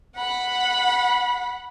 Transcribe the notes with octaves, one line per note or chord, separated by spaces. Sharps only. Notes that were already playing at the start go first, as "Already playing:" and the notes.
F#5 B5